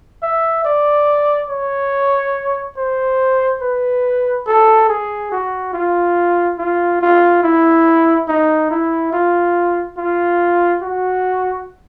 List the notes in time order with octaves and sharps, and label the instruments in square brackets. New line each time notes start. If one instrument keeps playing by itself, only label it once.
[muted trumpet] E5
D5
C#5
C5
B4
A4
G#4
F#4
F4
F4
F4
E4
D#4
E4
F4
F4
F#4